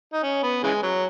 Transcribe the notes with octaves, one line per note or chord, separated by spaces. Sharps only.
D#4
C#4
B3
C#3 E3 G#3
F#3